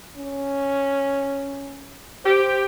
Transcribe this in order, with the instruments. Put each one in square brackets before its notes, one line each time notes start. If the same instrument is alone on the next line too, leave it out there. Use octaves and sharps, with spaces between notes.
[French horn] C#4
[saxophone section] G4 [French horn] C5